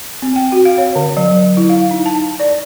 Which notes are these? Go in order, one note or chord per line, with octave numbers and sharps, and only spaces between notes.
C4
G5
F#4
F5
C#5
D3
F#3
E4
F5
D#4
A5
D5